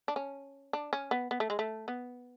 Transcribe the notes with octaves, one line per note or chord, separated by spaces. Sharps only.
D4
C#4
D4
C#4
B3
B3
A3
G#3
A3
B3